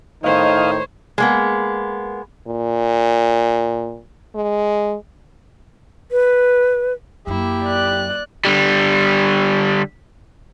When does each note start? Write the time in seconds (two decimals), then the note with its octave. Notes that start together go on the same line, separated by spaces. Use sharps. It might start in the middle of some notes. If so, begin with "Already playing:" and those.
0.24 A2 D#3 D#4 C5 C#5 D#5 F5
1.18 G#3 A#3 B3
2.48 A#2
4.35 G#3
6.12 B4
7.27 F#2 F#3 A#3 E4 G4
7.64 D5 F#6
8.45 D3 G3